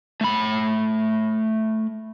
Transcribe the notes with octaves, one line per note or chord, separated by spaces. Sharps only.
A3 B5